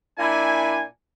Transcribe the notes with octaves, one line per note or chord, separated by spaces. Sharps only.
A#2 D4 E4 G#5